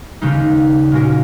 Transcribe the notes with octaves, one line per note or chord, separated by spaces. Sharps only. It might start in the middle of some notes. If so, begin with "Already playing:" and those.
D#2 C#3 G#3 D#4
A#2 G#3 C#4 F#4 A#4